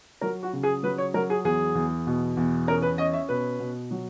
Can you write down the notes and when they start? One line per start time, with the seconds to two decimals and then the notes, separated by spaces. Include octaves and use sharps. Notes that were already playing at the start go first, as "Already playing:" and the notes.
0.21 F#3 A#4
0.43 F#4
0.53 C#3
0.63 G#4
0.83 F#3 B4
0.98 C#5
1.14 F#3 A#4
1.30 G#4
1.44 E2 G#4
1.75 E2
2.07 B2
2.37 E2
2.67 C#4 A#4
2.82 B4
2.98 C#4 D#5
3.13 E5
3.29 B2 B4
3.60 B2
3.91 F#3